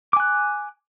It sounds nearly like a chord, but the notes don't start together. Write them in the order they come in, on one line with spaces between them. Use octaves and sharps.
D6 G#5 F#6